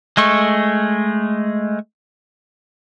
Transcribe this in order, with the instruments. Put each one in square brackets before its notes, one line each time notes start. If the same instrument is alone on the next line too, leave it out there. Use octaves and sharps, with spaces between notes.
[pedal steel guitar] G#3 A3 C#6